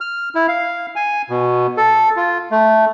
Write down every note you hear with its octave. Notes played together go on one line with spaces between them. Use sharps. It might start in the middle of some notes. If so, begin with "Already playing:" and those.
F6
E4
F5
G#5
B2
A4
F4
A3